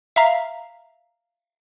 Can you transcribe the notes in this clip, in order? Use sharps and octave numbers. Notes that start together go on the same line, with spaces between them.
E5 F5 A#5